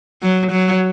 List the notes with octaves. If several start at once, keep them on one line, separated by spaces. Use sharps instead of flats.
F#3
F#3